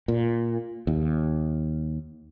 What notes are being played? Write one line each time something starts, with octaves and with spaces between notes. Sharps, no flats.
A#2
D#2